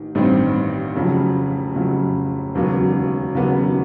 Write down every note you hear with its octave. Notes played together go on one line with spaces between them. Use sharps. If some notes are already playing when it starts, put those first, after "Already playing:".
Already playing: A1 D#3
A1 G2 D#3 G3 C4
F1 F2 C#3 F#3
F1 F2 C#3 F#3
E1 D#2 C#3 F#3 B3
E1 D#2 C#3 F#3 B3